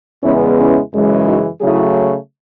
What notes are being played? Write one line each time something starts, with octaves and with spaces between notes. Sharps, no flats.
E2 C#3 G#3 B3 C#4 E4
C#4 E4
F#2 C#3 E3 G#3
D#4 F#4
C#3 F#3 A3 E4 G#4